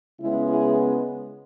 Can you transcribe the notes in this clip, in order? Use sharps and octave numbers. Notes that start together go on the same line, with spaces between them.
C#3 G#3 B3 E4
E4 G#4